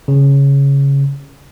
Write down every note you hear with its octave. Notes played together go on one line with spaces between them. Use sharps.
C#3